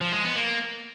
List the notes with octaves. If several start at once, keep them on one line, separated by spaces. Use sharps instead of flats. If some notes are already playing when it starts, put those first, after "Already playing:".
F3
G#3
B3
A#3